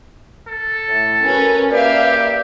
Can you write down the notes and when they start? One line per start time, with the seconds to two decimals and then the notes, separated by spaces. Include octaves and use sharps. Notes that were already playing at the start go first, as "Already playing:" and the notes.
0.48 A4
0.88 A2
1.25 C#4 F#4 A#4 B4
1.71 A#3 G4 B4 D5 E5 F5